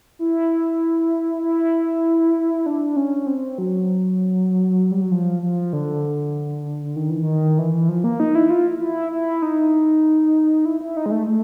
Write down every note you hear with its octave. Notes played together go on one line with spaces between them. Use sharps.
E4
E4
D4
C#4
C4
F#3
G3
F#3
F3
F3
D3
D#3
E3
D#3
E3
E3
F3
A#3
D#4
E4
F4
E4
E4
D#4
E4
E4
D#4
G#3
A3
A3